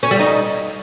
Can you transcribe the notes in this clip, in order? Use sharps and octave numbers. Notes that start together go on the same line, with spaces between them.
C#4
G3
D#4